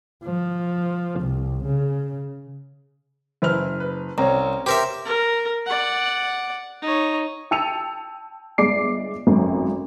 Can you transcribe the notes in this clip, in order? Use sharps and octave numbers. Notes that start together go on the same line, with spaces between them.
F3
C2
C#3
F#1 E4 B4 F6 F7
B4
C2 C4 C#4 C#5 A#5
G4 A#4 C5 E5 C6
A#4
D5 F#5
D#4 C#5
G5 A5 E6 C#7 D#7 F7
G1 G#3 D5 D6 C7 D7
G#1 F#2 A3